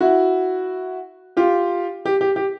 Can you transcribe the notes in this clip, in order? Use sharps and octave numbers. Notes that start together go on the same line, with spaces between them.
E4 F#4
F4 G4
G4
G4
G4